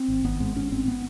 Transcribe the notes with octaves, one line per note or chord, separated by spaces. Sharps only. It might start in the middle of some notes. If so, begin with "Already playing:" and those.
Already playing: C4
G#1
G#1 B3
G#2
G#2 C#4
G#1 C4
B3